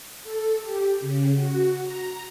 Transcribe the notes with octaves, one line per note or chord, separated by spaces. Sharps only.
A4
G4
C#3
F#4
A#5